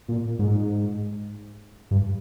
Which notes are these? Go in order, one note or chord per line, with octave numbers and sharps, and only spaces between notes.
A#2
G#2
G2